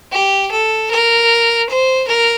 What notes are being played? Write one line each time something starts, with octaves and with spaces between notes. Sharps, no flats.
G4
A4
A#4
C5
A#4